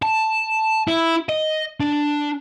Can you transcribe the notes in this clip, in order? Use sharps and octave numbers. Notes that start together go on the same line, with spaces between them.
A5
E4
D#5
D4